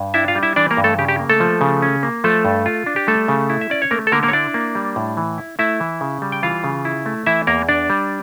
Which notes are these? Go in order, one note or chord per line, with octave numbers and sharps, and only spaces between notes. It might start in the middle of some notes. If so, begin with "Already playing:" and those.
Already playing: G2
D4 E4 E5
F4 F5
G3
E4 E5
E3 D4 D5
A#3 A#4
G2
A3 A4
C#3 G4
G4
A#3
A3 A4
F3
C#3
C#4
A#3
F3 A3 A4
G2
F4
D4
G4
G3 A3 A4
C#3
E4
E5
C#4 D5
C#5
A3 A#3 A#4
A4
D3 A#3 A#4
A#3 A#4
C#5
D4 E4 D5
A#3
G3
A2
E3
E4
A3 E4 E5
E3
C#3
G3
G5
E3 F4 F5
C#3
E4
A3
E3 E4 E5
E2 A#3 A#4
D4 D5
G3